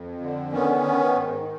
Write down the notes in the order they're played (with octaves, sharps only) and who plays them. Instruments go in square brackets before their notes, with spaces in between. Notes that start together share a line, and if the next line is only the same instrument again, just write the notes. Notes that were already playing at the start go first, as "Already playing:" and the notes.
Already playing: [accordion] F2
D3
D#3 B3 C#4
D#3
G#2